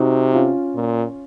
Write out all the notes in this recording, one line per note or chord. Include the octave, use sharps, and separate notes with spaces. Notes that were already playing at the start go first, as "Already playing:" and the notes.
Already playing: C3 D#4 F#4
C#4 F4
A#2